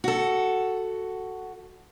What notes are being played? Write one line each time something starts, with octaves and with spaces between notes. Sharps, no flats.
F#4 A4